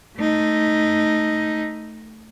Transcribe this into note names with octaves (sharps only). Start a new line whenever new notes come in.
A3 D#4